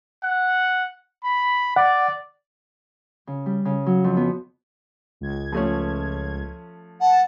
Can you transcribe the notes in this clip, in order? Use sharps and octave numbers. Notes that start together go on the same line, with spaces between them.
F#5
B5
D5 F#5
C#3
G3
C#3
F#3
F2
B3
C#2 G#6
F3 A3 C#4
F#5 A5